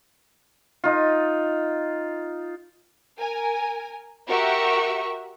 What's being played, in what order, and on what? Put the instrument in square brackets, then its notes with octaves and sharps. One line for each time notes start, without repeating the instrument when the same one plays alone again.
[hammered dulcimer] D#4 F4
[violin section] A#4 G#5
F#4 G4 A#4 E5 F#5 C#6